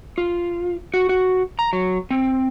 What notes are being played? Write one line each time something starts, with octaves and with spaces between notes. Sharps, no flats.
F4
F#4
F#4
A#5
F#3
C4